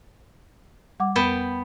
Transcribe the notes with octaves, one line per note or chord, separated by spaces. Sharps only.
G3 F#5 D6
F2 B3 G5 A5